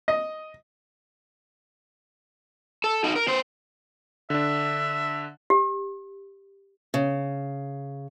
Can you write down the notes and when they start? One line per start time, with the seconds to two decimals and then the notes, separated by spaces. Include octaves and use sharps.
0.08 D#5
2.84 A4
3.04 D#4 F#4
3.16 A#4
3.28 B3 C5
4.30 D3 D4 E5
5.50 G4
6.94 C#3